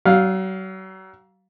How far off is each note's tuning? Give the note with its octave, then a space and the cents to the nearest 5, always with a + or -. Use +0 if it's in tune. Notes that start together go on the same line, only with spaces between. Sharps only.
F#3 +40 F5 +10